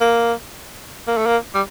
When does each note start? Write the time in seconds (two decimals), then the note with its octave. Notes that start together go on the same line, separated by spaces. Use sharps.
0.01 A#3
1.07 A#3
1.17 A3
1.26 A#3
1.54 G3